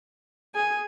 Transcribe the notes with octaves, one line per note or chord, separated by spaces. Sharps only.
G#4 G#5